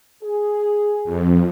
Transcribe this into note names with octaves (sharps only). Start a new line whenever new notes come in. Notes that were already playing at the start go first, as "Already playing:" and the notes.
G#4
F2